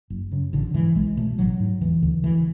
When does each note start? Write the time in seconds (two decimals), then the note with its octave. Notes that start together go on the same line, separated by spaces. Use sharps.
0.10 F#1
0.31 F#2 C#3
0.53 A1 D3
0.74 G#2 E3
0.95 B1 G#3
1.17 B2 A3
1.38 A1 F#3
1.60 G#2
1.81 E1 E3
2.02 D2 D3
2.24 D2 E3